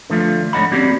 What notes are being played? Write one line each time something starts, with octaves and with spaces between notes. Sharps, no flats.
D3 F3 A3 F4
G#2 D3 C#5 D#5 F#5 B5
A#3 C4 C#4 F#4 G4 D5